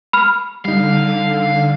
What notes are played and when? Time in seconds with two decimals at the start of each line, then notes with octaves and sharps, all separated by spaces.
0.13 B5 F6
0.65 D3 G3 D#4 F5